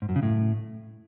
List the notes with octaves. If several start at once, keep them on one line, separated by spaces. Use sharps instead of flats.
G#2
F#2
C#3
A2